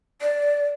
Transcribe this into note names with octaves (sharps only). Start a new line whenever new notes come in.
D5